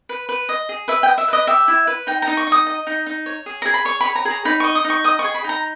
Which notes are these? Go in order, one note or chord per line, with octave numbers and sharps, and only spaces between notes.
B4
B4
D#5
G#4
B4 E5
G5
D#5
E5
B4 D#5
G4 E5
E4
B4
D#4 G5
A#5
D#4
C#6
D#4
D#6
D#5
D#4
D#4
C#5
G#4
G#4 A#5
B5
C#5 C#6
C#5 B5
A#5
G#4
A#5
D#4 B5
D#5 C#6
D#6
D#4
C#6
D#5 D#6
C#6
G#4
B5
D#4 A#5